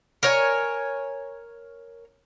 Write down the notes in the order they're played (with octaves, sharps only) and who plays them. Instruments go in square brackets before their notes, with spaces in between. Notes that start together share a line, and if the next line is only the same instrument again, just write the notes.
[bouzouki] A#4 C#5 G#5